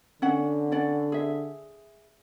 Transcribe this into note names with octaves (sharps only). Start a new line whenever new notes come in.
D3 C#4 F#5
C#4 D5 F#5
G#4 E5